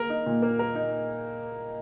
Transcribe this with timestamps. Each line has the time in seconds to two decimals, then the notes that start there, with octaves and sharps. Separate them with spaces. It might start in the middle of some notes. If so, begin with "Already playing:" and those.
Already playing: A#3 A#4
0.10 D#4
0.26 A#2
0.42 A#3
0.59 A#4
0.75 D#4